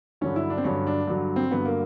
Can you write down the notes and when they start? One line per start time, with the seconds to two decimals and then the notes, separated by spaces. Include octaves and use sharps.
0.21 G2 D3 F#3 C#4
0.36 E4
0.50 D4
0.57 C4
0.64 G2 D3 F#3 C#4
0.87 D4
1.07 G2 D3 F#3
1.36 C4
1.51 G2 D3 F#3 B3
1.65 A#3